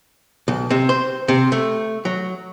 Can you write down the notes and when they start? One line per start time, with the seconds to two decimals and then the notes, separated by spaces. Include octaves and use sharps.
0.48 B1
0.70 C3
0.89 C5
1.28 C3
1.52 A3
2.05 F#3